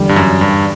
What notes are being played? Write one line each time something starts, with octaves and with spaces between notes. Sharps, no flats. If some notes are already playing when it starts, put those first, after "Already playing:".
Already playing: E2 D3 G3
G2
F#2
G2